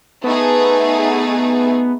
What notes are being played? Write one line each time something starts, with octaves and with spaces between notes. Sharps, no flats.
A3 B3 D#4 G#4